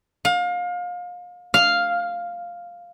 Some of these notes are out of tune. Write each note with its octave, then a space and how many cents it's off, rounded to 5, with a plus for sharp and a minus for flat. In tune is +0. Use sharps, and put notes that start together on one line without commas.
F5 +30
F5 +0